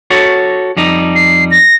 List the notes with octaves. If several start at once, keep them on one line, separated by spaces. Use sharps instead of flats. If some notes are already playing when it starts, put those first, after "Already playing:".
F#4 A4 C#5
F2 G3 D#4
C7
A#6